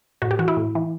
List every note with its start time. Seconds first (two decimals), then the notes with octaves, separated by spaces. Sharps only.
0.22 A2 F#4
0.31 G4
0.39 E3 F#4
0.48 E4
0.57 A2
0.75 E3